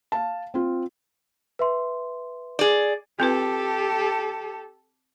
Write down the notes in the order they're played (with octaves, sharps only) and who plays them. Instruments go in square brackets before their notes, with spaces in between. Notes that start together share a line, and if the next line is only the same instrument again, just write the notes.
[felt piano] F5 A5
C4 F4
[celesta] B4 E5 C6
[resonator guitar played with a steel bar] G#4 D5
[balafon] C4 F4 B4 [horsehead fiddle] G4 A4